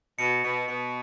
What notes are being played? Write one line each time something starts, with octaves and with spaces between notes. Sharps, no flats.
B2 C#7
B2
B2